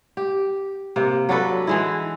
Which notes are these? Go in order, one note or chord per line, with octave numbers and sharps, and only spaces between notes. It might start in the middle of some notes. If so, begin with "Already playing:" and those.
G4
C3 A#3
F#3 D4 A4 B4
E3 G#3 E4